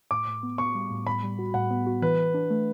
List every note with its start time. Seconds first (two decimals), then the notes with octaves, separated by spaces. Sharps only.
0.11 A2 D6
0.27 A2
0.43 B3
0.58 B3 C#6
0.75 G3
0.91 A2
1.07 A2 B5
1.23 G3
1.39 F#4
1.54 A2 F#5
1.70 B3
1.87 F#4
2.02 E3 B4
2.19 E3
2.34 D4
2.50 A3